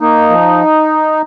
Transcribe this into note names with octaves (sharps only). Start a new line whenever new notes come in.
A#3 D#4
F3